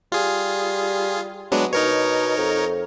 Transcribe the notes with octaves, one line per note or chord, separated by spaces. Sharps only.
G3 F4 G#4
F#3 G#3 B3 D4
B2 D#4 A#4 C#5
F2